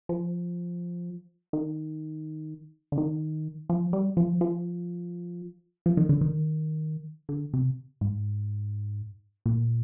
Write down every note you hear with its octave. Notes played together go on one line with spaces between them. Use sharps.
F3
D#3
D3
D#3
F3
G3
F3
F3
F3
D#3
D3
D#3
D3
C3
G#2
A#2